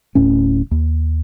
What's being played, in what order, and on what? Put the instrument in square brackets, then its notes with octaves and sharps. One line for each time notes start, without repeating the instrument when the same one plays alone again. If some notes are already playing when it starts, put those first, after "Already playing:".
[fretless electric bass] D1 A2 C#4
D#2